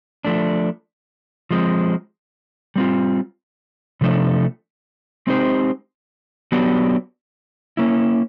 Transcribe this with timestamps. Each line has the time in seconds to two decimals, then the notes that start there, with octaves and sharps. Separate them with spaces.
0.25 F3 A3 D4
1.51 F3 G#3 C4
2.76 G3 C4 F4
4.01 C3 F3 A3 D4
5.27 G#3 C4 D#4 G4 C5
6.52 F#3 B3 D4 G4
7.77 A#3 C#4 E4